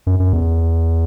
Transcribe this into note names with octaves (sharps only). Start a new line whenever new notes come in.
F#2
F#2
E2